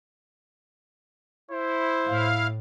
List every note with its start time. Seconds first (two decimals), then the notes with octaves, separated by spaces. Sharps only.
1.51 E4 C5
2.06 A2 F5